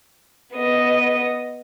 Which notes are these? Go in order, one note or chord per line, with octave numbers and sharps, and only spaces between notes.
B3 D#5